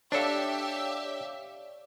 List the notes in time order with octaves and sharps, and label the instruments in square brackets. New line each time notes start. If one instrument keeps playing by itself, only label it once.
[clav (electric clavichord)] D4 A4 [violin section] G4 E5 [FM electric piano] C#5 D5 F5